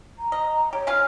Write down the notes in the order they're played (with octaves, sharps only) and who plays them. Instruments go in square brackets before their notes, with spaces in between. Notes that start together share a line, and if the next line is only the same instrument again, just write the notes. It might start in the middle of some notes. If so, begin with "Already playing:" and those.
[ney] A#5
[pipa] D#5
[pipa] G4 [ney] C#5
[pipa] C#4 F4 F5